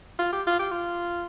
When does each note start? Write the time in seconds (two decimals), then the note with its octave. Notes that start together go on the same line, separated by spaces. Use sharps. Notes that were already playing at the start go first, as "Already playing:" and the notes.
0.19 F4
0.33 G4
0.47 F4
0.59 G4
0.71 F4